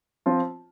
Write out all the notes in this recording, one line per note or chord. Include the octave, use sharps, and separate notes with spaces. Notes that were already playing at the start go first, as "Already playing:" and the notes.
F3 C4 F4